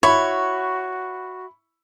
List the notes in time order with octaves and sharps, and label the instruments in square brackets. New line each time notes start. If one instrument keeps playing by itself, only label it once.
[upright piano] E4 B5 C#6 [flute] F#4 [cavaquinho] C#5